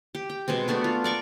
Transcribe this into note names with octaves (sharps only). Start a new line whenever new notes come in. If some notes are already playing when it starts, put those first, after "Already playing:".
G4
G5
B2 G#3 B3 C4
A3 B3 D4 F#4
F4
A#4 D5 C#6